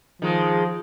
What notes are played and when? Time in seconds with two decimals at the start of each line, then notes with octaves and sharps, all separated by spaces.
0.22 D#3 F3 G#3